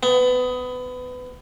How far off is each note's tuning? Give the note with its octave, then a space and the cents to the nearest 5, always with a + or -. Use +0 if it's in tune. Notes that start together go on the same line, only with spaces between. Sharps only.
B3 +25